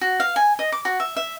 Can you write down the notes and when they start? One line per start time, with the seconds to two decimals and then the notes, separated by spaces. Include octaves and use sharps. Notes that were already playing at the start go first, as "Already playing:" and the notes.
0.01 F#4
0.20 F5
0.36 G#5
0.59 D#5
0.72 D6
0.85 F#4
1.00 E5
1.17 E5